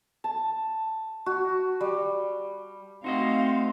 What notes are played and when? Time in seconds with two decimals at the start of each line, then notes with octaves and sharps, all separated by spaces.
0.24 A5
1.26 F#4
1.81 G3
3.04 A3 C4 D#4 F#4 D#5 F5 C6